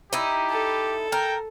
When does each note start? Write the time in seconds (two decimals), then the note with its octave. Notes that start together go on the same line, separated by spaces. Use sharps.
0.13 D#4 E4 G4
0.50 A4
1.12 A#4 G5